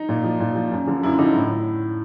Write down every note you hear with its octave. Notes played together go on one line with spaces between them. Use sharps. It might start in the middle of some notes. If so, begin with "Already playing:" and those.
Already playing: D#4
A#2
F3
A#2
F3
F#2
D3 F3
F#2 E4
D3 F3 D#4
A2 E4